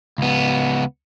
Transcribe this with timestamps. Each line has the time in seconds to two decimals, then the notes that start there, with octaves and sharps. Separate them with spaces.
0.18 C#2 B3